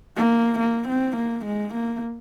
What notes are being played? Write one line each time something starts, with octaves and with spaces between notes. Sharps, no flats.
A#3
A#3
C4
A#3
G#3
A#3